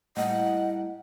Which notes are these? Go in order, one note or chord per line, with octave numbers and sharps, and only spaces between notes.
A2 G3 A#3 D#5 F#5